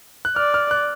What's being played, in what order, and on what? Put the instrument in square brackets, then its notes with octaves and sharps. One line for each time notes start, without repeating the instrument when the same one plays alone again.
[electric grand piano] F#6
[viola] D5 [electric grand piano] F6
[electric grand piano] F6
F#6